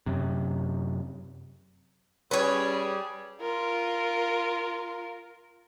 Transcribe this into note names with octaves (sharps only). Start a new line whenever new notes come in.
F#2 C3
G3 C#4 G#4 B4 C#5
F4 A#4